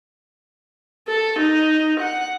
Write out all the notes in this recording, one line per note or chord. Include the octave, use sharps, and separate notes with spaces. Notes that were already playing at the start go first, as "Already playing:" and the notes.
A4
D#4
F#5